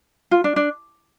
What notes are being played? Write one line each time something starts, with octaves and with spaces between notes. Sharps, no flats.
F4
D4
D4